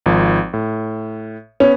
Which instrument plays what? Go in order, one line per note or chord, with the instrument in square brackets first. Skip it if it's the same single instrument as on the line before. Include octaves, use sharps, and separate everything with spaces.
[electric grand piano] G#1 F3
A2
[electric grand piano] B3 [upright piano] C#4